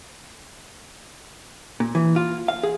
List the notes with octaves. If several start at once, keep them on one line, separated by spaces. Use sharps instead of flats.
A#2
E3
F4
F5
G#4